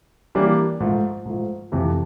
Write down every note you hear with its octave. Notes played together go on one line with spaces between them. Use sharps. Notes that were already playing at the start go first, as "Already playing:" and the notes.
E3 G3 A#3 D4 G4
G#2 F3 A3
G#2 F3 A3
F2 C3 E3 A3